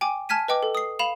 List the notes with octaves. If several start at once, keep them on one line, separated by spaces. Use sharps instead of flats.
G5 G#5 D6
G#5 A5 F6 G#6 B6 D#7
B4 D#5 G5 D6
A4
D#6 C7
F5 B5 E7 F7